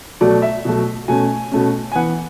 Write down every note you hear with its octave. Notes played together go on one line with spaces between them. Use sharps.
B2 F#3 A3 D5
E5
B2 F#3 A3
B2 A3 C#4 G#5
B2 A3 C#4
G#5
E3 B3 F#5